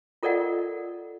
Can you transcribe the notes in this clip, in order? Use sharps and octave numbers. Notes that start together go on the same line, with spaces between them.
F4 A4 A#4 D5 D#5 F#5